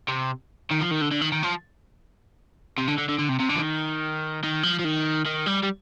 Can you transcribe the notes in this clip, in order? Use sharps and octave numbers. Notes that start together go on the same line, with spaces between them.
C3
D#3
F3
D#3
D3
D3
D#3
D#3
F3
C3
D3
D3
D3
D3
C3
C3
D3
F3
D#3
D#3
F3
F3
D#3
D#3
G3
G3